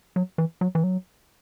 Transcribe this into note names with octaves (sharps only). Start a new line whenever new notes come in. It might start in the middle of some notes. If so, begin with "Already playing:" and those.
F#3
E3
F#3
E3
F#3